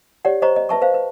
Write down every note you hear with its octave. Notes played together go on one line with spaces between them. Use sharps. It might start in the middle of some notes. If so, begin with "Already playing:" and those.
G4 C#5 D5 F#5
C5 C#5 D#5 A#5 C#6
D#5
B4 E5 A5 C#6
B4 C5 F5
B4